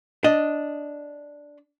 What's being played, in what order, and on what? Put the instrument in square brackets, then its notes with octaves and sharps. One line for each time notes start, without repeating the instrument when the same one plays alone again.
[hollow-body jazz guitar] D4 D#5